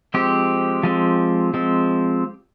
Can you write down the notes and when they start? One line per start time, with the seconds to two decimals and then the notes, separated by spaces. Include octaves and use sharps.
0.14 F3 G#3 C4 G4
0.83 F3 G#3 C4
1.54 F3 G#3 C4